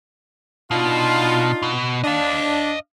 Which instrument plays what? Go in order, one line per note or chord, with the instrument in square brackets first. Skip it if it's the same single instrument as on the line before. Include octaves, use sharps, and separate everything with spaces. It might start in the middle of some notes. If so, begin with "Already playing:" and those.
[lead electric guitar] B2 [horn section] D4 D#4 F4
[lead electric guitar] B2
[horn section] D4 [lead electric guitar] D#5 F5